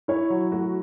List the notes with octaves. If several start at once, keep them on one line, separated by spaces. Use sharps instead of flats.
E4 C#5
F#3
A3 F#4